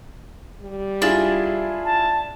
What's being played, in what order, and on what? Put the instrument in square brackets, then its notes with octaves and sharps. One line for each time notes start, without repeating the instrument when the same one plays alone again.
[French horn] G3
[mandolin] D4 [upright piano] E4 F4 G#4
[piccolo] A5